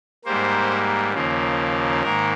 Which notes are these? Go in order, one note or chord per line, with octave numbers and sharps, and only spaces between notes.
G#2 G3 A#3 C5
D#2 C#3 F3 A#3
G#2 D#3 A#3 A#4